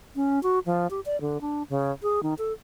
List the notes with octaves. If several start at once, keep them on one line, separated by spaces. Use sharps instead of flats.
C#4
F#4
F3
G4
D5
D3
D4
C#3
G#4
D#3
A4